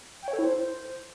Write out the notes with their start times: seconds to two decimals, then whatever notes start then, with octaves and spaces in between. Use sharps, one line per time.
0.22 G5
0.28 C#5
0.33 A4
0.39 E4
0.44 C5